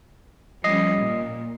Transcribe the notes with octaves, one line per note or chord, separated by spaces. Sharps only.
F3 G3 C#4 D#5 C7
A#2